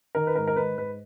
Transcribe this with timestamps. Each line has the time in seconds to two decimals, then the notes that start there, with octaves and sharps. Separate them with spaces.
0.15 D#3 A#4
0.27 B4
0.36 G#2 A#4
0.48 A#4
0.56 G#2 B4
0.77 G#2 B4